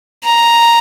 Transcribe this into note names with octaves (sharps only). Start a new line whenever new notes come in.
A#5